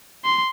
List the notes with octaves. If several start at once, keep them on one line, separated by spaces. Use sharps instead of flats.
C6